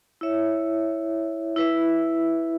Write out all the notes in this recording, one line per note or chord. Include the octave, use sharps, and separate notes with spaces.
E4 C#5 E5
E4 B4 E5